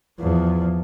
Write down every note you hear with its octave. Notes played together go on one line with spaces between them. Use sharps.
E2 F3